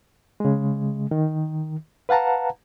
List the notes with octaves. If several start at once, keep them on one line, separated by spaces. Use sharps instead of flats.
C#3 G#3
D#3
B4 F5 F#5 A5 A#5